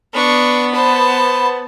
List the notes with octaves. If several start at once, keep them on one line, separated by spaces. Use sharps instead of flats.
B3 D4 C#6
C5 A5 B5